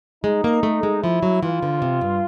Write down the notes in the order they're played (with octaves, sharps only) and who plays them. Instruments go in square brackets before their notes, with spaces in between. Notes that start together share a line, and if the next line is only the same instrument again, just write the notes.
[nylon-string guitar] G#3 [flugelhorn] D#4
[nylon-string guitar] A#3
A3
G#3
[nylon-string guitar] F3 [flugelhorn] E4
[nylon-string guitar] F#3
[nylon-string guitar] E3 [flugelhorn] F4
[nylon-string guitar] D3
C3
G2